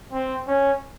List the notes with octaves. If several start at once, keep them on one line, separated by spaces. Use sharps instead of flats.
C4
C#4